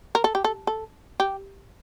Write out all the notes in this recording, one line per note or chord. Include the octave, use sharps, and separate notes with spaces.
A#4
A4
G4
A4
A4
G4